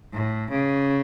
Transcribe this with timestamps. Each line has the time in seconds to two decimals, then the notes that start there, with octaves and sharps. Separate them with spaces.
0.14 A2
0.50 C#3